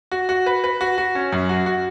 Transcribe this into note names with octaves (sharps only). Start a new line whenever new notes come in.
F#4
F#4
B4
B4
F#4
F#4
C#4
F#2
F#4
F#4